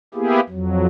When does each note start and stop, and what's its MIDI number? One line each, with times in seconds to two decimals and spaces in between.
0.14 0.40 58
0.14 0.40 59
0.14 0.40 64
0.14 0.40 67
0.14 0.40 68
0.49 0.86 41
0.49 0.86 54